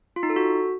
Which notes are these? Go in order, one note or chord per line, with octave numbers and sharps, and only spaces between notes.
F4
D#4
A4
F#4